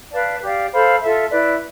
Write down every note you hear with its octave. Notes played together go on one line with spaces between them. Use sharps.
B4 D5 F5 A5
G4 D5 F5
A4 C5 F5 B5
F4 A4 E5
E4 B4 D5